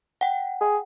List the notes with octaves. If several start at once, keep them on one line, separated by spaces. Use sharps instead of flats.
F#5 G5
G#4